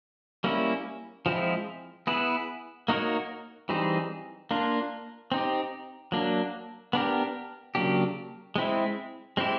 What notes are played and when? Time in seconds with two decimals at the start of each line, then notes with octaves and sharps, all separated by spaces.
0.44 G3 A#3 C#4 E4
1.26 F3 G#3 C4 E4
2.07 B3 E4 G#4 B4
2.88 A#3 D#4 F#4 A#4 C#5
3.69 E3 G3 C4 D#4 G#4
4.51 A#3 D4 F4
5.32 C4 D#4 G4
6.12 F#3 A#3 D4
6.93 B3 D4 G4 A#4
7.75 C#3 F#3 A#3 D4 G4
8.56 G#3 C4 E4
9.37 G#3 C4 E4 G4